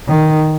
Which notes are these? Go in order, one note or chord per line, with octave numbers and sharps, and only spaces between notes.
D#3